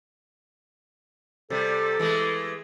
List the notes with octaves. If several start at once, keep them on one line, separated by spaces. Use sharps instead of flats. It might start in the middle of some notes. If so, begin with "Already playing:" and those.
C3 G3 A4
E3 G#3 A3